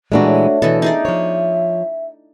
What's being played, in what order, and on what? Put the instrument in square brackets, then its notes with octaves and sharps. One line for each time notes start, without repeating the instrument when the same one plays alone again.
[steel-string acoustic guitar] A#2 E3 G#3 [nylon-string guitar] A3 D4 F#4
[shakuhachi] C#5
[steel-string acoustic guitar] B2 [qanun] E3 A4 [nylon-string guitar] D#5
[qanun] D#4 G#4 D5 [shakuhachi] E5
[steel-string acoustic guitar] F3 C#5